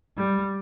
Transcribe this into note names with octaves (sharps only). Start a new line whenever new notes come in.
G3